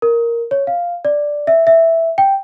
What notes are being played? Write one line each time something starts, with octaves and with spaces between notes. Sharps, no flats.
A#4
C#5
F5
D5
E5
E5
G5